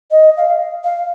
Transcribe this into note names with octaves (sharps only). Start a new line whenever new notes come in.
D#5
F5
F5